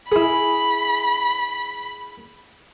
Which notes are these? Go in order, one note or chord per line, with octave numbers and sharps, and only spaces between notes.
E4 G#4 B5